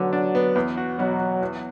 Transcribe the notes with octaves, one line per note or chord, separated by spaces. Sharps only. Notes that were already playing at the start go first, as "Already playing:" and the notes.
Already playing: D3 F#3 A3 B3
D4
B3
E2
F#4
B2 F#3
F#4
E2